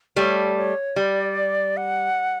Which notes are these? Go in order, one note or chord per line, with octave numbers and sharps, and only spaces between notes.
G3 A3 C#5
C#5
G3 D5
F#5